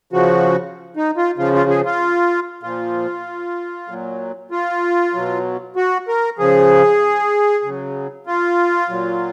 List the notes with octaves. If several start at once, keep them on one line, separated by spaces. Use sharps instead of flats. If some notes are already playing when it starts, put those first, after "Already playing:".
C#3 F3 F#4
D#4
F4
C#3 F3 F4
F4
G#4
F4
A#2 F3 F4
A#2 F#3
F4
B2 F#3
F#4
A#4
C#3 F3 G#4
C#3 F#3
F4
A#2 F#3